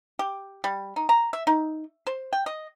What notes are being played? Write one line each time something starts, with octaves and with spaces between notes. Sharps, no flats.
G4
G3
D#4
A#5
E5
D#4
C5
G5
D#5